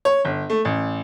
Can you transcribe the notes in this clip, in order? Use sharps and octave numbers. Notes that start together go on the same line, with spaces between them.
C#5
G1
A3
A1